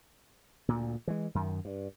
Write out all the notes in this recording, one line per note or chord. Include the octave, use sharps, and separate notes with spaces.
D2 A#2
E3 G#3
F#2 D#3
G2